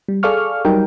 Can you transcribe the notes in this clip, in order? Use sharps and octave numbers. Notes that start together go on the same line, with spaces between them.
G3
G#4 A4 D5 F5 C#6 F6
F#3 G3 D#4 A#4 G5